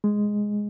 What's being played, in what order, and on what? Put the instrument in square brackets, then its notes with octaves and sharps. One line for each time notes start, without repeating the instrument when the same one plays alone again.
[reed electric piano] G#3